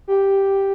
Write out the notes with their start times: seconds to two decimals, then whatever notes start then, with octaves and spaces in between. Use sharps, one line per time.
0.08 G4